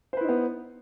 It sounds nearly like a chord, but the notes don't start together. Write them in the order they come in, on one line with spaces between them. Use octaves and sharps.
C5 B4 E4 D#4 B3